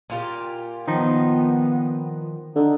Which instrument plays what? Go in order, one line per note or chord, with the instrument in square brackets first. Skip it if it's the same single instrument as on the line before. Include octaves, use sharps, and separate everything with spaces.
[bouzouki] A#2 F4 G4
[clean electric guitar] D#3 F3 D#4 [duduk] B3
[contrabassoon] D3 [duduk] D#4